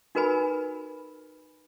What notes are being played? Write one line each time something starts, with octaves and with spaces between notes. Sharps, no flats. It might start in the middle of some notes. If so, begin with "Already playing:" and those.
D#4 F#4 A#4 B4 G#5 B5